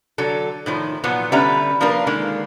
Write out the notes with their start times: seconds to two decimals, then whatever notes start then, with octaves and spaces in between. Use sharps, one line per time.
0.18 D3 F#3 A4
0.66 A2 D#3 F3
1.04 A#2 F3 F#3 B3
1.32 D3 G3 C#4 B4 E5 A#5
1.81 F3 A#3 D4 A#4 B4
2.07 D3 D#3 G#3 A#3